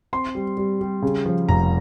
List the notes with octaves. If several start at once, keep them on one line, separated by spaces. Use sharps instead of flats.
C4 C6
G3
G3
G3
C#3
F3
F1 A#5